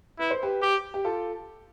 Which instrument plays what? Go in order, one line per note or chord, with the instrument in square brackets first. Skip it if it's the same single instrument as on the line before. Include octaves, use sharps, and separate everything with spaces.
[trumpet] E4 [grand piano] B4
[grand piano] C5
G4 B4
[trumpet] G4
[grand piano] G4
F4 A4